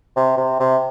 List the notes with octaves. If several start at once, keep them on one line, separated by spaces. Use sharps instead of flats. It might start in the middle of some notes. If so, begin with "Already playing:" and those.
C3
C3
C3